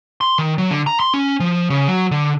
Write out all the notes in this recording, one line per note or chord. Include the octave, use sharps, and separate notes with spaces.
C6
D#3
F#3
D3
A#5
C6
C#4
F3
C#3
F#3
D3